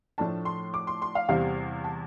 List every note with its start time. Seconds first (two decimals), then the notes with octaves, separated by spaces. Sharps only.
0.18 A2 F3 A3 D4 A5
0.45 C6
0.74 D6
0.87 C6
1.02 C6
1.15 F5
1.29 E2 C3 G3 C4 F5
1.84 A5